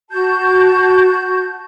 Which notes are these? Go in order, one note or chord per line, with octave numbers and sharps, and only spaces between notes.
F#4 A5 G6